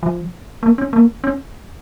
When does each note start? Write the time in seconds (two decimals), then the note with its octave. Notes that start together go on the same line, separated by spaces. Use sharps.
0.03 F3
0.63 A#3
0.78 C#4
0.93 A#3
1.24 C#4